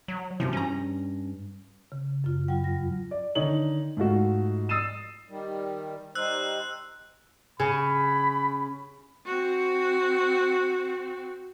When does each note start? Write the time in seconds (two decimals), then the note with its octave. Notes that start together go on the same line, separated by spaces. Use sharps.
0.08 F#3
0.40 F#2 C3 E3 F3
0.53 G2 C#4 A#5
1.92 C#3
2.24 F#2 F4
2.48 F#3 F4 G5
2.64 F2 A#6
3.11 D5
3.35 D3 D#3 D#4 C#5 F#7
3.97 G#2 A3 F4 F#4
4.69 D#6 E6 A6 C7 D#7 E7
5.29 D#3 G3
6.15 G3 D#4 C5 E6 F#6
7.60 C#3 B5
9.25 C4 F#4